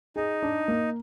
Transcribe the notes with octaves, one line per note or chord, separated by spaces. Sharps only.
D#4 G#4
D4
A#3